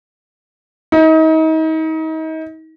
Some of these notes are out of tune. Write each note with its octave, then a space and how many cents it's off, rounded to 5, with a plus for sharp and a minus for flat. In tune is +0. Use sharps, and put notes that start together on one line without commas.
D#4 +35